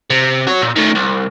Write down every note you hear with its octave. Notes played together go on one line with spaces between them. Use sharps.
C3
F#4 C#5
A#2
D#3 A3
C2